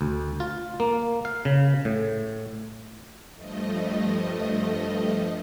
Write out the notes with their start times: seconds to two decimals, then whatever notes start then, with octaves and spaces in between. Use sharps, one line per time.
0.01 D2
0.40 F4
0.80 A#3
1.25 F5
1.45 C#3
1.85 A2
3.36 G2 F3 A3 D#5